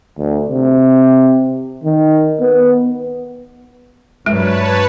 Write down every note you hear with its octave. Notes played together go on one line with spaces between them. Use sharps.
D2
C3
D#3
B3
G2 F#3 G#3 B4 C#5 A5